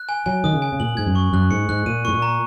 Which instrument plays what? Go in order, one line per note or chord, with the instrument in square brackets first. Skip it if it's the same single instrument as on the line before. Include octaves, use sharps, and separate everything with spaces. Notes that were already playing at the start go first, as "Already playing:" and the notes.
Already playing: [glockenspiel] F#6
G#5
[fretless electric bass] F#3 [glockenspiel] G#5
[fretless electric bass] D#3 [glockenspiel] D#6
[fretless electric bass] C#3
[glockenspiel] G#5
[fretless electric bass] C#3
[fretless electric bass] A#2 [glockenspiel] F#7
[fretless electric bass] G#2 [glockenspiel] G#6
[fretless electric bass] F#2
[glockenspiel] C#6
[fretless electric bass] F#2 [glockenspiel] F#6
[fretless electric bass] G#2 [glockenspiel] C#7
[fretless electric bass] G#2 [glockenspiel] F#6
[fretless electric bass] A#2 [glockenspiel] D#7
[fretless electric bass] G#2 [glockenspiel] C#6
[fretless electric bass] A#2
[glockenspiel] A#5